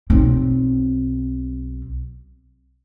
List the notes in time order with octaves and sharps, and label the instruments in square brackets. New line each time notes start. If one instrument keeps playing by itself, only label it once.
[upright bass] B1 C4